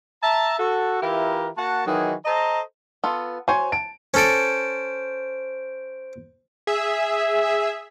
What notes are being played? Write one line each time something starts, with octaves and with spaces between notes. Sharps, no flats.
E5 A5 A#5
F#4 A4
E3 E4 F4 G4 A#4
A#3 F#4 F#5 A5
D#3 E3 F#3 D#4 F#4 G#4
A4 C5 D#5 A5 A#5
B3 F4 A4
F#4 C5 C#5 G#5
A5 D7
C#4 A4 C5 D5 D7
G#4 E5